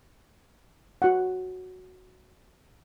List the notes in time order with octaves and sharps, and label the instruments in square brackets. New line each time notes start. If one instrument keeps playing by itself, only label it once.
[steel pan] F#4 F#5